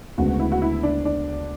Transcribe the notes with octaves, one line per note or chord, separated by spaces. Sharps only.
D2 C#3 G#3 B3 F#4
E4
F#4
E4
D4
D4